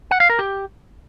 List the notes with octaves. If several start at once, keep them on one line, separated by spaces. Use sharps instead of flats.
F#5
F5
A#4
G4